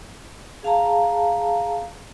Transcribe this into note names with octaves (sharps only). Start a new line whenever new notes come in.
G#4 F5 A5 A#5